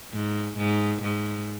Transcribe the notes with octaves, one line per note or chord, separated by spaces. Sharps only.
G#2
G#2
G#2